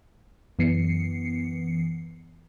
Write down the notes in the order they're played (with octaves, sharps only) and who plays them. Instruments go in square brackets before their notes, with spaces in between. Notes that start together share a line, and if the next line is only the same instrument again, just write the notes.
[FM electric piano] F#2 E3 B3 C7 C#7